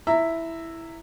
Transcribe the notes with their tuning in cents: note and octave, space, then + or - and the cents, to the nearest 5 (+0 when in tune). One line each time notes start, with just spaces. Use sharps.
E4 +0 E5 +0 A#5 -20